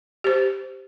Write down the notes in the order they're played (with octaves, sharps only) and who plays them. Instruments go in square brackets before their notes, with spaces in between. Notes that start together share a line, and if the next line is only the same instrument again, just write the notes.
[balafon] G4 C5